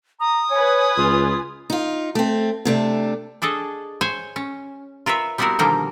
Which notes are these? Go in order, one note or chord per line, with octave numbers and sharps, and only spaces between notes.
A#5 D#6
B4 C#5 G#5
C#2 F4
D#4 F4
A3 C4
C3 A3 D4
D4 G#4 A4 D#5
C5 C#5 G#5
C#4
F4 A#4 B4 C#5 E5
G3 B3 C4 E4 F#4 A#4
B2 D3 D#3 F3 G3 A#3